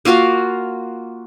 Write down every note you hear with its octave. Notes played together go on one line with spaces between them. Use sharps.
A#3 F4 F#4 F5